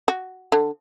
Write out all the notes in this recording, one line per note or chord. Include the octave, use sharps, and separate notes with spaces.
F#4
D3